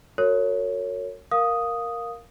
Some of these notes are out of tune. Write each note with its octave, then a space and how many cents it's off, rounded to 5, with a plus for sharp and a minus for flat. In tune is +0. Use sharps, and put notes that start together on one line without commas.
F#4 +0 A#4 -40 C#5 +0
A#4 +0 F5 +10 D#6 +0